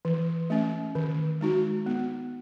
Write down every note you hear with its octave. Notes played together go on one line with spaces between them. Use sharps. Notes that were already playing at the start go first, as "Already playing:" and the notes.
E3
A3 C#4
D#3
G#3 D#4 F#4
B3